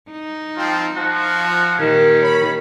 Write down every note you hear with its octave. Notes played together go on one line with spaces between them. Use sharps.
D#4
F3 C4 F4
F3 F#4
A#2 D#3 C#4 G4
C#5 B5